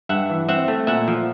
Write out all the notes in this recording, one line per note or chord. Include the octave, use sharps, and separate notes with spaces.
G2 E5 F#5
E3
C4 E5 F#5
A3
A#2 E5 F#5
F3